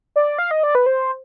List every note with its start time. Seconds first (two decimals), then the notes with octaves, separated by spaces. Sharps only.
0.16 D5
0.38 F5
0.51 D#5
0.63 D5
0.75 B4
0.86 C5